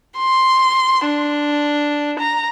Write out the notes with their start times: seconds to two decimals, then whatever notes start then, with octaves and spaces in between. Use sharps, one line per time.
0.17 C6
1.06 D4
2.19 A#5